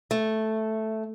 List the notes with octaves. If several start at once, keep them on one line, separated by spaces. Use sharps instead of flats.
A3